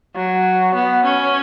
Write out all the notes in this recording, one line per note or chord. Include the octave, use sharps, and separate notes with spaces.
F#3
B3
C#4